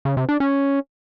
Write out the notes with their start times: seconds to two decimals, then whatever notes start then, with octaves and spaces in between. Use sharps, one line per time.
0.05 C#3
0.17 C3
0.29 D4
0.40 C#4